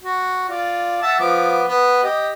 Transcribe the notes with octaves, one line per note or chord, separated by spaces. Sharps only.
F#4
F4 D5
E5 F#5 A5
F3 B3 D6
B3
G4 D#5